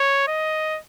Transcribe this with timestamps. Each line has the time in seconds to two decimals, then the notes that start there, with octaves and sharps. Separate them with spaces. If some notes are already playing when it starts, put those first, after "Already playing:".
Already playing: C#5
0.28 D#5